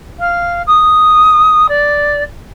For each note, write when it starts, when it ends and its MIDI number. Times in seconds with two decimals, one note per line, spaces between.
0.19 0.62 77
0.67 1.67 87
1.69 2.23 74